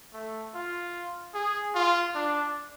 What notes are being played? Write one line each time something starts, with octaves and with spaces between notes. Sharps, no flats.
A3
F4
G#4
F4
D4